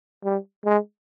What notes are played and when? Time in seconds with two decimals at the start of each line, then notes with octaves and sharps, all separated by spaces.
0.25 G3
0.65 G#3